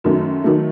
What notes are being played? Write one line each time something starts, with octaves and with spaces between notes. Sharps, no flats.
F#2 D#3 F#3 A3
D#3 F#3 A3